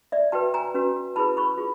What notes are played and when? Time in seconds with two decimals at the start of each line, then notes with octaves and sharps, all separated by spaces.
0.12 D5 E5
0.32 F#4 B4 G5 A5
0.54 G#5 A#5
0.74 C#4 F#4 B4
1.16 E4 G#4 B4 A5 B5
1.37 B5 C#6
1.58 F4 G#4